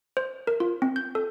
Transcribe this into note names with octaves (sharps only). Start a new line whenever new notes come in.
C5
A#4
F4
C4
G6
A4